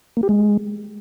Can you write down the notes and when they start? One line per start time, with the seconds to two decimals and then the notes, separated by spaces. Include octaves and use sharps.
0.17 A#3
0.23 G4
0.29 G#3